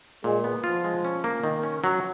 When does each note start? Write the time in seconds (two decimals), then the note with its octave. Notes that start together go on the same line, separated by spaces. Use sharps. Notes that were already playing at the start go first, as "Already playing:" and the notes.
0.24 A#2 G#3
0.44 B3
0.64 F3 F4
0.84 G#3
1.05 C#4
1.24 A#3
1.44 D#3
1.63 C#4
1.84 F#3